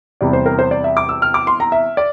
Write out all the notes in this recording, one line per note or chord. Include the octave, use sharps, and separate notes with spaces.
E2 C3 G3 D5
C5
A#4
C5
D5
E5
D6
E6
F6
D6
C6
A#5
E5
D5